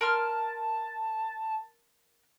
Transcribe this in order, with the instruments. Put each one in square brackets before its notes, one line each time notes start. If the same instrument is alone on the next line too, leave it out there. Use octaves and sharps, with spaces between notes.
[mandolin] A#4 C6 F6 [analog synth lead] A5